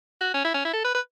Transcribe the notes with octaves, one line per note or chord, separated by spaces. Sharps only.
F#4
C#4
E4
C#4
E4
A4
B4
B4